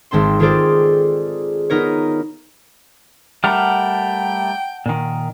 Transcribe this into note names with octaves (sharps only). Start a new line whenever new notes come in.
G#1 G#3 C4 A5 C6
D#3 F4 G#4 A4 C5 D5
B3 D#4 A#4 C#5
G3 A3 A#4 F#5 G5 A5 F6
A#2 D#3